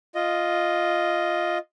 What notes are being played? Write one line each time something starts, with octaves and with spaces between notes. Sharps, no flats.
F4 D#5